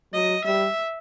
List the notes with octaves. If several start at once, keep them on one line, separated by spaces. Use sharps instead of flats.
F#3 D#5
G3 E5